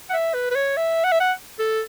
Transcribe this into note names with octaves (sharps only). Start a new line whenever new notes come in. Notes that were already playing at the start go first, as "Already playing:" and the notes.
F#5
E5
B4
B4
C#5
E5
F#5
E5
F#5
A4